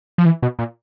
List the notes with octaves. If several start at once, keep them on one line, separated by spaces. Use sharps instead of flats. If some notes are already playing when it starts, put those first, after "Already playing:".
F3
E3
B2
A#2